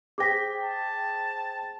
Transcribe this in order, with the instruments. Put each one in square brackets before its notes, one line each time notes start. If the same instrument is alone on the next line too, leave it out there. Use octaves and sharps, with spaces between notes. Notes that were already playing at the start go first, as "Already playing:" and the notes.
[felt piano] G#4 C5 G5 [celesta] D6 A#6 B6
[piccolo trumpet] A5